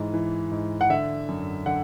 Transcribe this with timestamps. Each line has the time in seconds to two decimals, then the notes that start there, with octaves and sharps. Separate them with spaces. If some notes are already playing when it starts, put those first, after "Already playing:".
Already playing: G#2 E3
0.14 E3
0.51 G#2
0.81 F#5
0.90 D3 E5
1.28 F#2
1.66 D3 F#5